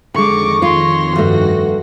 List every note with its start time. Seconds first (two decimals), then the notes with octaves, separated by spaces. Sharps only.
0.15 F2 D3 D#3 G#3 C#6 D6 A#6
0.62 F4 C#5 C6
1.16 G2 A3 F#4